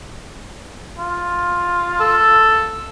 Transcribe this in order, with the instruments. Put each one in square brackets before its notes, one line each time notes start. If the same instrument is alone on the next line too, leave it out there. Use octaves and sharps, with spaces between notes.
[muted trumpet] F4
[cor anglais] A4